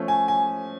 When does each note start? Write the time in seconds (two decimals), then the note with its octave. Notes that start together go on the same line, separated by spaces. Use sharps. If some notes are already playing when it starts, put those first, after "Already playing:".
Already playing: F3 A3 C#4
0.08 G#5
0.28 G#5